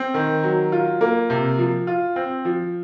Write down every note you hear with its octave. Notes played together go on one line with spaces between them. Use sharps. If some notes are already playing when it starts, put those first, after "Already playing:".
Already playing: C4
D#3
F#3
F4
A#3
C3
F3
F4
C4
F3